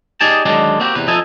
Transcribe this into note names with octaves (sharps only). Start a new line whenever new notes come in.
D#4 G4 G#4 D5 G#5 A5
D3 D#3 F#3 G#3 D4
A#3 C4 F#4 G4
E2 C3 B4
F2 F3 D#4 A4 E5 G#5